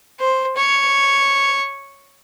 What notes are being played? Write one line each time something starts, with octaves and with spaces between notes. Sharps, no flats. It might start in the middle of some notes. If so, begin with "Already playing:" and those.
C5
C#5